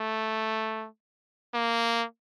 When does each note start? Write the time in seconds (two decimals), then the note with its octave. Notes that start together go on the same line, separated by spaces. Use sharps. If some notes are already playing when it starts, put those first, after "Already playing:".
Already playing: A3
1.54 A#3